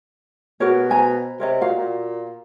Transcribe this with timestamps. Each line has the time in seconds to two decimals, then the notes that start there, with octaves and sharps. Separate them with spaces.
0.60 B2 F#4 A#4 C#5
0.90 C5 G#5 A#5
1.40 C3 A#4 C#5 D#5
1.61 A#2 F#4 F5
1.78 A#2